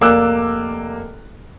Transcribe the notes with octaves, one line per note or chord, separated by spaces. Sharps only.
F1 A#3 D5 D6 E6 F#6